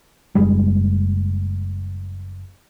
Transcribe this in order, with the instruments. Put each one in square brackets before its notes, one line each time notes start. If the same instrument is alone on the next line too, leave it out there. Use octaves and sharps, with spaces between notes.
[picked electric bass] F#1 G3 G#3